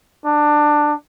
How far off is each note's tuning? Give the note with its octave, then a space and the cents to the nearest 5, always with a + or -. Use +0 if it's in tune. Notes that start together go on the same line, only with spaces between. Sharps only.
D4 +15